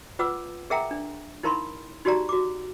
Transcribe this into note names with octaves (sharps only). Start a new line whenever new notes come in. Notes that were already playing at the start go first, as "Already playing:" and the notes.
F4 B4 F#5 D6 E6
G#4 A#4 E5 F#5 G5 A#5
D4
D#4 E4 A#4 F5 B5 C6
D#4 F#4 G4 D5 A#5
F#4 D6